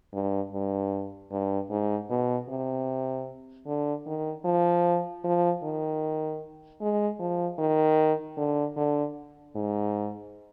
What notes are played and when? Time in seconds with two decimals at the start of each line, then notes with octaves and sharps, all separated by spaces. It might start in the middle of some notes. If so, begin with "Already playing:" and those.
0.13 G2
0.53 G2
1.32 G2
1.70 G#2
2.10 B2
2.49 C3
3.67 D3
4.06 D#3
4.45 F3
5.24 F3
5.63 D#3
6.81 G#3
7.19 F3
7.59 D#3
8.38 D3
8.76 D3
9.55 G#2